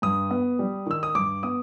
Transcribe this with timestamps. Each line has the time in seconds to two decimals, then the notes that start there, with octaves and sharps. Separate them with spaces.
0.02 G2 D#6
0.31 B3
0.59 G3
0.86 D#3 E6
1.03 D#6
1.15 G2 D6
1.43 B3 D#6